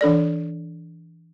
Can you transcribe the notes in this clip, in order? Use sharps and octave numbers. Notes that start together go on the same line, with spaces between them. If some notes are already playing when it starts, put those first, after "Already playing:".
E3 D4 A4 D5